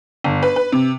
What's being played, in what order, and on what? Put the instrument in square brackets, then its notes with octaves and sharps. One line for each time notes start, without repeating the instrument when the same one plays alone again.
[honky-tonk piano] G1
B4
B4
C3